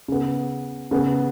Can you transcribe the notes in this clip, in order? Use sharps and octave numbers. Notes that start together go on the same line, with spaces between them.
C#3 B3
C#3 B3